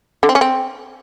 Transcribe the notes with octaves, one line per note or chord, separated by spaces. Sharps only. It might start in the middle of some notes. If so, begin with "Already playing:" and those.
D3
C4
C#4
C4